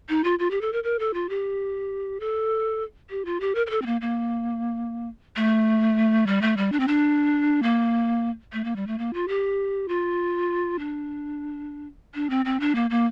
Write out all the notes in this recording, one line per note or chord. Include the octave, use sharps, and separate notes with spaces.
D#4
F4
F4
G4
A4
A#4
A#4
A4
F4
G4
A4
G4
F4
G4
A#4
A#4
A4
C4
A#3
A#3
A3
G3
A3
G3
D4
C4
D4
A#3
A3
A#3
G3
A3
A#3
F4
G4
F4
D4
D4
C4
C4
D4
A#3
A#3